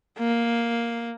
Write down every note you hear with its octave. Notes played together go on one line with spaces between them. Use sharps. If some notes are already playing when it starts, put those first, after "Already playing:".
A#3